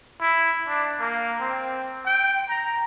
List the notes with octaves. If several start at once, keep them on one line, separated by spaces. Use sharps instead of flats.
E4
D4
A#3
C4
G5
A#5